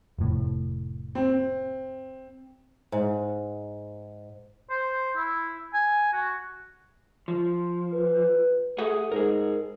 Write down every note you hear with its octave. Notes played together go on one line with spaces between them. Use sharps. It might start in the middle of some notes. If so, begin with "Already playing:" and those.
F1 A2
C4
G#2
C5
E4
G#5
F#4
F3
B4
A3 G4 G#4 F#5
G#2 G#4 A#4